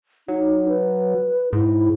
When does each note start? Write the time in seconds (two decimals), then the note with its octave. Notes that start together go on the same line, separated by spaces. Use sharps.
0.28 F#3 D#4
0.69 B4
1.53 G#2 E4